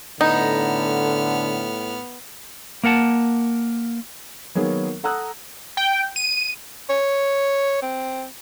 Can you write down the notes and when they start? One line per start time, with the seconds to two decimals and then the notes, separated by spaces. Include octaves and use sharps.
0.21 A2 D3 B3 D#4 F6
2.84 A#3 A#4 F#5 A5
4.55 D#3 F#3 A#3 B3 G#4 C#5
5.04 A4 F#5 A#5 D#6 E6 F#6
5.77 G5
6.16 D#7
6.90 C#5
7.82 C4